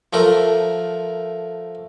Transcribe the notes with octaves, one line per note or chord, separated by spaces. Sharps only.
F3 A3 A#4